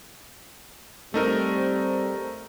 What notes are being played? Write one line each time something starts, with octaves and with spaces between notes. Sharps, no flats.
G3 A3 C4 D#4 A#4